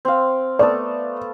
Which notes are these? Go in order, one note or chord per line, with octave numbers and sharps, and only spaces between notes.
C4 F5
A3 B3 A4 D5